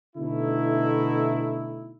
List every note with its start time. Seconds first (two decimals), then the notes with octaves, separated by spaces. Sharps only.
0.16 B2 D3 A3 D#4 E4